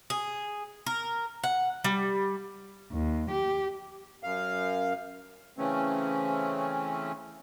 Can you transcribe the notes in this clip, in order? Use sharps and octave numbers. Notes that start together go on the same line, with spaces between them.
G#4
A#4
F#5
G3
D#2
G4
F#2 F5
C#3 E3 A3 C4 C#4